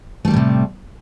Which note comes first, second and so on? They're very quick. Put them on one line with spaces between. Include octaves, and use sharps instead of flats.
A3 G3 D#3 A2 C3